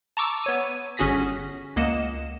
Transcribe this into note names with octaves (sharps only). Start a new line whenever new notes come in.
A5 A#5 C#6 D6 E6
B3 C#5 D#7
G1 C#4 F#4 G#4 A#6 B6
C#2 A#3 D#5 F#5 E7